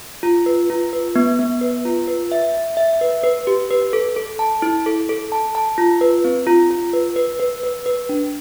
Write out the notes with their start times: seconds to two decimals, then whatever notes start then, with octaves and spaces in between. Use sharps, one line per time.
0.23 F4
0.46 B4
0.70 F4
0.93 B4
1.16 B3
1.39 B3
1.61 B4
1.85 F4
2.08 B4
2.32 E5
2.54 E5
2.77 E5
3.01 B4
3.23 B4
3.47 G4
3.71 B4
3.93 A4
4.16 A4
4.39 A5
4.62 E4
4.86 A4
5.09 A4
5.32 A5
5.55 A5
5.78 F4
6.01 B4
6.24 C4
6.47 F4
6.71 F4
6.93 B4
7.16 B4
7.40 B4
7.63 B4
7.86 B4
8.09 D4